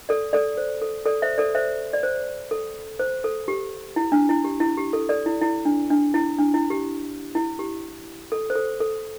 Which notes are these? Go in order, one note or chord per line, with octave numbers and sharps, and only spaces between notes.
A4 D5
A4 D5
C5
A4
A4 D5
C5 E5
A4 D5
C5 E5
D5
C5
A4
C5
A4
G4
E4
D4
E4
G4
E4
G4
A4
A4 D5
E4
E4
D4
D4
E4
D4
E4
G4
E4
G4
A4
C5
A4
A4